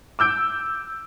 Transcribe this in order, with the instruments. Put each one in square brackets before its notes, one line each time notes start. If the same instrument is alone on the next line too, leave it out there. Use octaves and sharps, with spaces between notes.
[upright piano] D6 E6 G6 D7